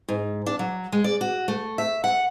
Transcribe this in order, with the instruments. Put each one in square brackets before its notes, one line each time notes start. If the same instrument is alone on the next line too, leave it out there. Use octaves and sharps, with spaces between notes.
[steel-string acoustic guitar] G#2
D4
F#3
G#3
D5
F#4
A3
E5
F#5